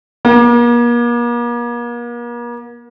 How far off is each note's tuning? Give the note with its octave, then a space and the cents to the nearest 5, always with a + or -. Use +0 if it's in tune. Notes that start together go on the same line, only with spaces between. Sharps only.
A#3 +40